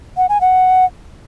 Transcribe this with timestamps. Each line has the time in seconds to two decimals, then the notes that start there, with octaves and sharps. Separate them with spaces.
0.17 F#5
0.29 G#5
0.41 F#5